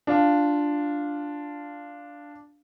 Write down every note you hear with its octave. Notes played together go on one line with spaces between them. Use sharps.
D4 F4 F5